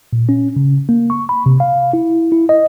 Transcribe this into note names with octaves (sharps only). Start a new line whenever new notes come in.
A#2
C#4
C#3
A#3
C#6
B5
C3
F5
E4
E4
D#5